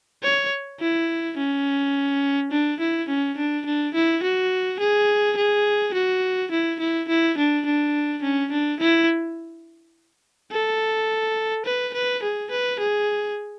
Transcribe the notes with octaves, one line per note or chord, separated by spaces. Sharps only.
C#5
E4
C#4
D4
E4
C#4
D4
D4
E4
F#4
G#4
G#4
F#4
E4
E4
E4
D4
D4
C#4
D4
E4
A4
B4
B4
G#4
B4
G#4